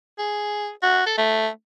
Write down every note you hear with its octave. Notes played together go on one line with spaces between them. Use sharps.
G#4
F#4
A4
A3